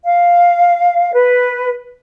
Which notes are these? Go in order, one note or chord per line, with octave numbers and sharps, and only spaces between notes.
F5
B4